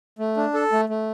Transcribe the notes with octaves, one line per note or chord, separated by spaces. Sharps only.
A3
D4
A4
A3
A3